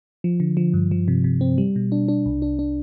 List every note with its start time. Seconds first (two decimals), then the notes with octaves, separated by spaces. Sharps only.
0.24 F3
0.40 D3
0.57 F3
0.74 G2
0.91 F3
1.08 C3
1.24 C3
1.41 C4
1.58 G3
1.76 B2
1.92 D4
2.08 D4
2.26 C2
2.42 D4
2.59 D4